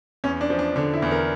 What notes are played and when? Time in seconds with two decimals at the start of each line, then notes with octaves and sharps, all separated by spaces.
0.24 E2 C#4
0.41 D4
0.50 F3
0.59 D4
0.76 D3 D4
0.94 E4
1.02 E2
1.11 A#4